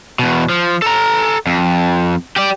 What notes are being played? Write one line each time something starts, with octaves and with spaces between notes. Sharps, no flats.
E2 B2
F3
A4 A#5
F2
G4 D5